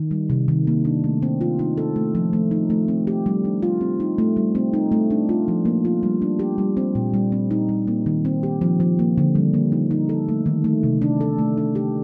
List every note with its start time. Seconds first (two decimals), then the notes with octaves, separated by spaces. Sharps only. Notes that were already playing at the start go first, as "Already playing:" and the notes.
Already playing: D#3
0.11 G3
0.30 C3
0.48 D#3
0.67 A#3
0.85 D4
1.04 A3
1.22 C4
1.41 F4
1.59 D#4
1.78 A4
1.96 A3
2.15 F3
2.33 A3
2.51 D#4
2.70 A3
2.88 C4
3.07 G4
3.26 G3
3.45 D4
3.63 F4
3.81 C4
4.00 D#4
4.18 A3
4.36 G3
4.55 C4
4.74 D#4
4.92 A3
5.10 D4
5.29 F4
5.48 F3
5.65 A#3
5.85 F4
6.03 G3
6.22 D4
6.39 G4
6.58 G3
6.77 C4
6.95 A#2
7.14 G3
7.32 C4
7.51 D#4
7.69 G3
7.87 A#3
8.06 D#3
8.25 C4
8.43 G4
8.61 F3
8.80 F3
8.99 A#3
9.18 D3
9.35 G3
9.54 A#3
9.72 D#4
9.91 D#4
10.09 A4
10.28 A3
10.46 D#3
10.64 A3
10.83 C3
11.02 D4
11.21 A4
11.38 A3
11.58 D4
11.75 G4